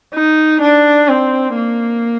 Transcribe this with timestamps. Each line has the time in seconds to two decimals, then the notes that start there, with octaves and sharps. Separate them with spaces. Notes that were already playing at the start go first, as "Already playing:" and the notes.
0.15 D#4
0.61 D4
1.09 C4
1.56 A#3